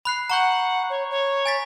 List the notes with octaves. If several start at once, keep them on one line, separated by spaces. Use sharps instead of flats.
B5 F#6 C7
F#5 A#5 C#6 G6
C#5
C#5
G#5 A6 B6